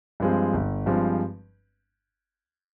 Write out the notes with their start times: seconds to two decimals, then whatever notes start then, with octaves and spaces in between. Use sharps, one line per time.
0.20 G2 F3 G#3 C4
0.53 G1
0.86 G2 F3 G#3 C4